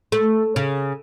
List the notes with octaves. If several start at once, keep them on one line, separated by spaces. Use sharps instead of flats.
A3
C#3